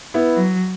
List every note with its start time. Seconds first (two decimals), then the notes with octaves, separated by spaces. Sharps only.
0.14 B3 E4
0.36 F#3